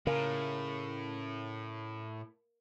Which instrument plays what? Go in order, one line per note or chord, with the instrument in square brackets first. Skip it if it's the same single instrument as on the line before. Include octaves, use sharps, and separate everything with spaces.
[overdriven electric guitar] A2 [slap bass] C#3 [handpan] A#4 F5